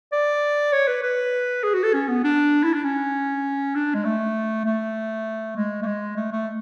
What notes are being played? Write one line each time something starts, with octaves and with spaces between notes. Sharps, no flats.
D5
C#5
B4
B4
G#4
F#4
A4
C#4
B3
D4
E4
D4
C#4
D4
G#3
A3
A3
G#3
A3
G#3
A3
A3